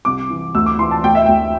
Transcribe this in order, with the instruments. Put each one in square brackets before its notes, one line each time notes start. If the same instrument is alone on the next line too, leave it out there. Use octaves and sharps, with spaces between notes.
[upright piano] C2 D6
E3
D2 E6
D6
E3 C6
A5
D2 G5
E5
D2 G5